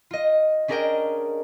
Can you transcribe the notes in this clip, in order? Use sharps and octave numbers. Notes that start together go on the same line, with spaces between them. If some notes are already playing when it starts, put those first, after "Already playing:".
F4 D#5
C#4 D4 G#4 A#4 D#5 G5